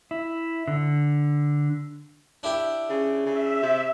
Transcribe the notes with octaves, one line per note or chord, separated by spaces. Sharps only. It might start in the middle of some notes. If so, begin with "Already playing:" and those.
E4
D3
D4 E4 G4
C#3
C#3 E5
C3